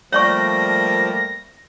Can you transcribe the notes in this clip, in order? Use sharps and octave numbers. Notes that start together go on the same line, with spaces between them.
F3 G3 A3 A#3 C#5 D5 C#6 A#6